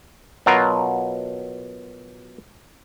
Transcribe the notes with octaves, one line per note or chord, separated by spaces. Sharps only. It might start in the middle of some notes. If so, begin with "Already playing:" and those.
B2 F#3 F4 A#4